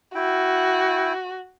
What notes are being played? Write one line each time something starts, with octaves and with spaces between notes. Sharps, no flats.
E4 F#4 G5